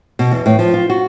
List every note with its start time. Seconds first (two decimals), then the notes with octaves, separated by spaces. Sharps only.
0.19 B2
0.31 E2
0.46 A2
0.59 F3
0.74 F4
0.90 F#4